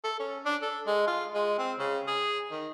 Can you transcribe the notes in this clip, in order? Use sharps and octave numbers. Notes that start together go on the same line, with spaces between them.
A4
C#4
D4
A4
G#3
F4
G#3
C4
C#3
G#4
D#3